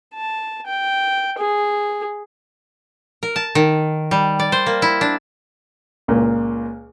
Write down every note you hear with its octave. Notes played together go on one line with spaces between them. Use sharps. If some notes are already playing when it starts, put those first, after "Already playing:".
A5
G5
G#4
A#4
A5
D#3
G3
D5
C5
A#3
E4
D4
C#2 A#2 A#3